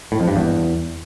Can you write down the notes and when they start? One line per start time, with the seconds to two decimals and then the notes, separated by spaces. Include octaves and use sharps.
0.12 A2
0.20 F2
0.28 G2
0.36 E2